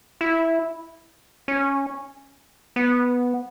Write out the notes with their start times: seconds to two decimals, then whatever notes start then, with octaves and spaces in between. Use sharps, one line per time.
0.21 E4
1.48 C#4
2.76 B3